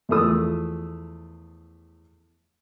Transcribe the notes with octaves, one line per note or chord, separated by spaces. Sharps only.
E2 F3 A3 D#6 E6